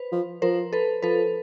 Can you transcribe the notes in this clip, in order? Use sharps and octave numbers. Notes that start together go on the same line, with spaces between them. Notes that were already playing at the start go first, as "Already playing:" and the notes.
Already playing: B4 C5
F3
F3 A#4 C5
A4 B4
F3 A4 B4